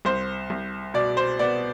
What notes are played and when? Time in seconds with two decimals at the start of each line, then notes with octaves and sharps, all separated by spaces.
0.05 C2 C5
0.50 C2
0.94 B2 D5
1.17 C5
1.39 B3 D5